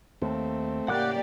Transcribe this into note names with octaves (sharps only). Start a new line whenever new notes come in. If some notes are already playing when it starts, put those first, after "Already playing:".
D#2 A3 C4
A2 C#3 A#3 G4 D5 F#5 D6 F#6